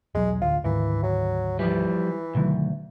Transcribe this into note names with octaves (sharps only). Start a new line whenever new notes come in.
E1 B1 F#3 G#3
A1 D2 F4
D2 G#2 D#3 E3
F#3
E3 F3 G3
D2 B2 D#3 F#3